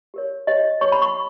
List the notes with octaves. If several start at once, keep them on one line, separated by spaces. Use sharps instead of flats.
G4 A#4 C#5
G4 C#5 D#5
G4 C#5 C#6
B5
C#6